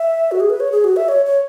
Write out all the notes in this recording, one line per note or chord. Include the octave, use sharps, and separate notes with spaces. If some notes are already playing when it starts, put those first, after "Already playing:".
Already playing: E5
F#4
G#4
B4
C#5
G#4
F#4
E5
C#5
C#5